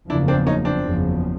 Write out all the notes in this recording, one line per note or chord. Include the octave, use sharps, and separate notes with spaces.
F#1 E2 C#3 F3 A#3 D4 E4
C4 D4
C#4 D#4
C4 D4
F#1 E2 C#3 F3